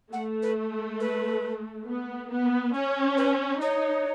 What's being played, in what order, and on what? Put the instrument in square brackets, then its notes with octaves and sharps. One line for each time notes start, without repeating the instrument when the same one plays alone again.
[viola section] A3 [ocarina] F#5
[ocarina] B4
B4
[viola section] B3
B3
[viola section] C#4 [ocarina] C#5
[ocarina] B4
[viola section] D#4 [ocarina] C#5